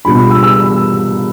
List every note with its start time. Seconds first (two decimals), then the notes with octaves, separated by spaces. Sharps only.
0.05 B2 G3 D4 F4 B5
0.30 E6
0.43 E6